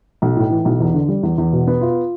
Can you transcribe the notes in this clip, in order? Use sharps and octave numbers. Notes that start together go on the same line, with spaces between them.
B1
A2
E3
B1
E2
D3
G3
E2
E2
B2
B3
F4